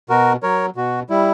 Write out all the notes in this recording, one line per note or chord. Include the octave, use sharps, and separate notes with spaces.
B2 F#4 A#4
F#3 A#4 C#5
B2 F#4
G3 E4